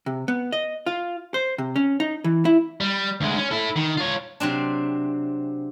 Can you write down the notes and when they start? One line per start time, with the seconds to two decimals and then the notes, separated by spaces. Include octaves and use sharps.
0.06 C3
0.28 B3
0.52 D#5
0.86 F4
1.34 C5
1.58 C3
1.76 C#4
2.00 D#4
2.24 E3
2.45 E4
2.80 G3
3.21 D2 G#3
3.37 C#4
3.51 E4 A4
3.76 D#3
3.97 F4 C#5
4.40 C3 F#3 C4 D4